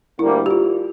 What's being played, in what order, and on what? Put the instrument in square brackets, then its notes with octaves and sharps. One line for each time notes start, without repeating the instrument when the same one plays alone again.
[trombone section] D2 D3 G3 A#3 [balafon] E4
[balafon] G4
F4